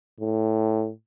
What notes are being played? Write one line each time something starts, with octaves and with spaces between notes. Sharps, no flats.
A2